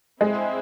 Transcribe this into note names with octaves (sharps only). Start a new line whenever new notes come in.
G#3 C4 E4 C5 E5